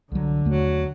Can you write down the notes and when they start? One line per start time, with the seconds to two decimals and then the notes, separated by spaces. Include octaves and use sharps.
0.12 C2 D3 F#3
0.45 D#2 F#3 A3